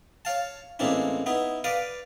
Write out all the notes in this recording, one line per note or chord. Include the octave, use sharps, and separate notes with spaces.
C#5 F5 A5
A1 G#3 A#3 C4 D4 E4
B3 D#4 E4
B4 D5 F5 D6 D#6